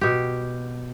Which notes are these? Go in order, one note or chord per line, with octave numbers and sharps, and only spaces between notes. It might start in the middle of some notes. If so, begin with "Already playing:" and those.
B2 G4